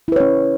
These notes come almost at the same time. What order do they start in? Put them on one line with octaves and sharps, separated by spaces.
E4 B4 C#5 C#4